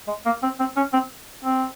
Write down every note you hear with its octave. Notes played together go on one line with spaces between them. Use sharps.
G#3
A#3
C4
C4
C#4
C4
C4